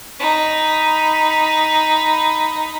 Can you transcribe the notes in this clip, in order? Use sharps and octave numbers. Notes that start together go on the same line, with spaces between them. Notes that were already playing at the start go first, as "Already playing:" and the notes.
D#4 B5